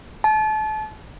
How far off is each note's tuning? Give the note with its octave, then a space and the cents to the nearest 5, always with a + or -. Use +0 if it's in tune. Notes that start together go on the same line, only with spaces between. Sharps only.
A5 -30